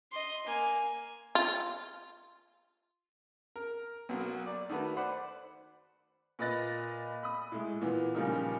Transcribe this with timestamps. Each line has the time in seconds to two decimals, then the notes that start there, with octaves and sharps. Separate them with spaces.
0.12 D#5 C6
0.46 A#3 G#5
1.35 F4
3.56 A#4
4.09 B1 F#3 A#3
4.46 D5
4.70 D#3 A3 F#4 B4
4.97 C5 D5 F#5 B5
6.39 A#2 B4 D#5 F#6 A6 A#6
7.23 B5 D#6
7.52 A2 G#3
7.81 A#2 E3 B3
8.15 A#2 C#3 F3 G3 A#3 D#4